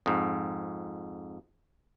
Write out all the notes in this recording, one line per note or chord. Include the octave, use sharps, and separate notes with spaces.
F2 G#2